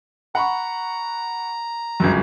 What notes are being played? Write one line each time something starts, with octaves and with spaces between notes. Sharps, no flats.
F#5 A#5 B5 C#6
G1 C#2 F#2